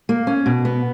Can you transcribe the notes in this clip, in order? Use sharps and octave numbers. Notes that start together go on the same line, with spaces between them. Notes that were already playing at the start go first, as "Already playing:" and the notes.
A#3
C#4
B2
B3